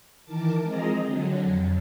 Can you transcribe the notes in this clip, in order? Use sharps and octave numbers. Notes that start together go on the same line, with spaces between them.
D#3 E3 A#4 A5 D6
F3 G#3 C4 G#4 D#5 A#5
D3 F#3
F2